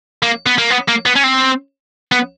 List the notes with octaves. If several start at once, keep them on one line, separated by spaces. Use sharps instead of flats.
A#3
B3
A#3
B3
A#3
B3
C#4
C4
B3